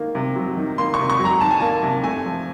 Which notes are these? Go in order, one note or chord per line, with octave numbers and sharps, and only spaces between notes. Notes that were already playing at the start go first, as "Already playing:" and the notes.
Already playing: D#3 A#3
C3
F#3
D#3
A#3 C6
C#6
C3
C#6
F#3
A#5
D#3 A5
G#5
A#3 A5
C3
A3 G#5
F3